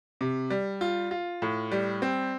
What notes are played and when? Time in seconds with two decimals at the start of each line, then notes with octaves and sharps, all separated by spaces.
0.21 C3
0.50 G3
0.81 F4
1.11 F4
1.42 A2
1.71 G3
2.02 C4